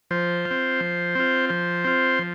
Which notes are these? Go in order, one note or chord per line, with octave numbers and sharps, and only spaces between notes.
F3 C5
F4
C4
F3
C4 F4
F3 C5
C4 F4
F3